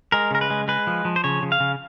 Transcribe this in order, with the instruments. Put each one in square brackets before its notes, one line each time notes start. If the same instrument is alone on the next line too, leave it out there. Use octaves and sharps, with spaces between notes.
[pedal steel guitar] G#3 A#4
C#3 A#4
B4
G#3
G#3 B4
F3
F3
C5
C#3 C#5
C#3
F5
C#3